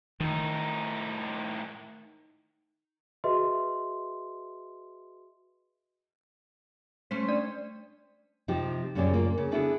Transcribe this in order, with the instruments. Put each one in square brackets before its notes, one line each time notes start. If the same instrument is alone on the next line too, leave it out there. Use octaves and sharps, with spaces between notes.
[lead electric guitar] A2 D#4 [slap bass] D#3
[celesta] F#4 G#4 B4 D#5 E5 C6
[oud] A3 C#4 C5 [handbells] B6
[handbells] D4 D5
[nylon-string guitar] C3 F3 D#4 G4
F#2 A#2 C#3 G3 C#4 D5
A#3 F4
C#3
B3 D4 E4 F#4 G#4 A4